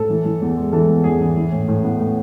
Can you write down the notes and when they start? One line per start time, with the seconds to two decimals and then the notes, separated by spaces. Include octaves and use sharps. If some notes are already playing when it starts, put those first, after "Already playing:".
Already playing: A2 A4
0.10 E3
0.25 E3
0.42 E2
0.57 G#3
0.73 E3 A4
0.89 E2
1.04 E2 G#4
1.21 E3
1.36 E3
1.52 A2
1.68 A2
1.83 B3
1.99 A2